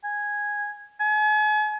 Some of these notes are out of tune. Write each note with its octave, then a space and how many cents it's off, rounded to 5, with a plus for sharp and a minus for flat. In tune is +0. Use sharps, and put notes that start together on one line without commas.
G#5 -5
G#5 +40